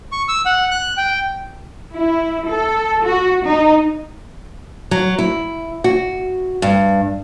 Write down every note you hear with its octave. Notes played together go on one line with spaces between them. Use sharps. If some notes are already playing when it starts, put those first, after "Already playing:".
C#6
E6
F#5
F#6
G5
E4
A4
F#4
D#4
F#3
E4
F#4
G2